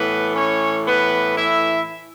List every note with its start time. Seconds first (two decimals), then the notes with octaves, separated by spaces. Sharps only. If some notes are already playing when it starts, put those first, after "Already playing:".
Already playing: A2 E3 B3 B4
0.35 C#4 C#5
0.86 B3 B4
1.36 E4 E5